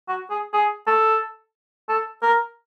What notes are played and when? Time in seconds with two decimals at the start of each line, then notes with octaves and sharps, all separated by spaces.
0.08 F#4
0.30 G#4
0.54 G#4
0.87 A4
1.89 A4
2.22 A#4